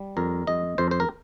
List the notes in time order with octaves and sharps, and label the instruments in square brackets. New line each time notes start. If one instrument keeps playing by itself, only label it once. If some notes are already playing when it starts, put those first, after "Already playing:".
Already playing: [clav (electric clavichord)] G3
F2 A#4
F2 D#5
F2 C5
C5
A#4